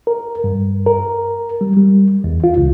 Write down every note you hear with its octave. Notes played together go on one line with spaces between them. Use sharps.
A#4
G2
A#4
G3
G3
E2
F4
C#2